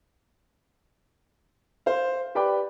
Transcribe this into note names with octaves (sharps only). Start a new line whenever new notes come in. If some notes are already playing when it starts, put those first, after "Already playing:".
C5 F5
G4 B4 D5 G5 B5 D6